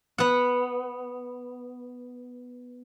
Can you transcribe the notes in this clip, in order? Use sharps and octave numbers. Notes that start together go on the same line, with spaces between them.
B3 F#5